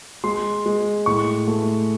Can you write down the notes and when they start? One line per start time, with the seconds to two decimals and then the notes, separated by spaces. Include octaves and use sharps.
0.24 G#3 C6
0.66 G#3
1.06 A2 C#6
1.48 A3